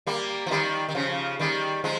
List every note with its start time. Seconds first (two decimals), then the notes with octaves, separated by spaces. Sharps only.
0.07 G3 A#3
0.46 F3
0.51 D#3 G3
0.89 D#3
0.95 C#3 F3
1.39 D#3 G3
1.84 F3 G#3